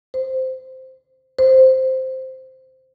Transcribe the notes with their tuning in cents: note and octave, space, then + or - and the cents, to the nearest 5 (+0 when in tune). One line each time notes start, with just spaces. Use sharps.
C5 -5
C5 +0